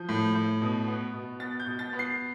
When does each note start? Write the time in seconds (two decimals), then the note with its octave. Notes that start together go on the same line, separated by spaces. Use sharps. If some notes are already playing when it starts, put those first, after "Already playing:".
Already playing: F3 G6
0.09 A2
0.35 A2
0.62 B2
0.88 B3
1.14 B2
1.39 B3 A6
1.60 G6
1.66 B2
1.79 A6
1.93 B3
1.99 C7